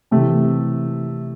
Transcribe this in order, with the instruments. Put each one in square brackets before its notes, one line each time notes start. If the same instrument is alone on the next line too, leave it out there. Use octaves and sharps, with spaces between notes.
[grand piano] C3 E3 A3